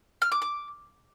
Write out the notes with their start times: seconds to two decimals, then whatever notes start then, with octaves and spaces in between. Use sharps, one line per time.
0.22 F6
0.32 D6
0.42 D6